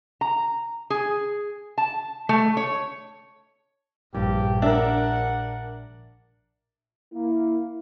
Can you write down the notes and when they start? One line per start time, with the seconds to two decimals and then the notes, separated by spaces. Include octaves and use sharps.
0.21 A#5
0.90 G#4
1.78 A5
2.29 A3
2.57 C#5
4.14 A#1 G2 G4
4.62 D4 A#4 E5 F#5
7.13 A#3 E4